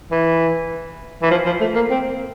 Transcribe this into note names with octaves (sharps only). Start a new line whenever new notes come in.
E3
E3
F3
F3
A3
A#3
C4